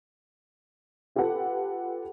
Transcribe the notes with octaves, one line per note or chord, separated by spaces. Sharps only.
F4 G4 A4 B4 F#5